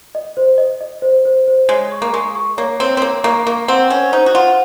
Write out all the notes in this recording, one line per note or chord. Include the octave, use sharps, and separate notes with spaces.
D#5
C5
D#5
D#5
C5
C5
C5
G#3 C#5
C#6
A#3
G#3 C#6
C#6
A#3 C#5
C4 C#5
C4
A#3 C#5
A#3 C#6
A#3 C#6
C4 F#5
C#4 C5
D#4 C5
F#4
F4 F#5